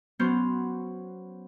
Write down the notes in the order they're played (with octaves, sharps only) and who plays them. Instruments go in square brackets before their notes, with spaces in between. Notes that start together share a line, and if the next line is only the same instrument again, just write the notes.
[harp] F#3 B3 C#4 C5 F6 G6